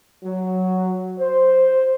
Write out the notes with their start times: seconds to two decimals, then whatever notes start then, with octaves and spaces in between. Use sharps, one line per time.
0.24 F#3
1.19 C5